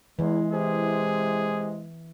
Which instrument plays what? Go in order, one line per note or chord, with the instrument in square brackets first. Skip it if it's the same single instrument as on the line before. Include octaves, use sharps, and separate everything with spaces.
[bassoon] E2 [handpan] E3 [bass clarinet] G#3
[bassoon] C3 [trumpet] G#4